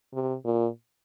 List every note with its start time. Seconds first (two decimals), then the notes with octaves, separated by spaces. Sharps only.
0.14 C3
0.45 A#2